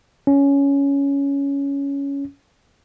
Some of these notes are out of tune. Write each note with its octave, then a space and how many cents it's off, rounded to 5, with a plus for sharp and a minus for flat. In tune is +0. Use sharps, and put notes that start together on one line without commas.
C#4 +10